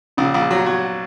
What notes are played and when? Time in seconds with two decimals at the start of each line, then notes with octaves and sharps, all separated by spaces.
0.17 A#1 C#3
0.34 A#1
0.51 F#3
0.66 F#3